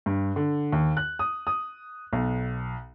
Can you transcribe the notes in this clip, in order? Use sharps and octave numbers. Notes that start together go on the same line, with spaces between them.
G2
D3
D#2
F#6
D#6
D#6
B1